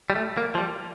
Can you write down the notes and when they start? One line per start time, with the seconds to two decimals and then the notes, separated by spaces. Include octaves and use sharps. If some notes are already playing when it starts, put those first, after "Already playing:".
0.10 G3
0.15 A3
0.37 A#3
0.55 F3
0.58 G3